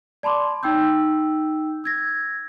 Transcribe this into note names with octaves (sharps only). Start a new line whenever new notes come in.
D5 A5 B5 C6 D6
D#4 G5 E6 G6
E6 G#6 A#6